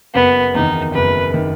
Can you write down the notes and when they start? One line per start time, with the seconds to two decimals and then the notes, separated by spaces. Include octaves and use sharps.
0.14 F#1 B3
0.55 E2 D#3 D#4
0.94 F#1 B4
1.34 D#3